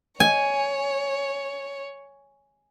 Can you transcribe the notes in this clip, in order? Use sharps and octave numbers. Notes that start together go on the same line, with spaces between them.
C#5 G#5